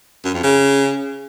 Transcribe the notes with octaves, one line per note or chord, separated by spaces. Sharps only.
F#2
F2
C#3